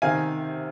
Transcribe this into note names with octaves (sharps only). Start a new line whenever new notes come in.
C3 D#3 F5 G#5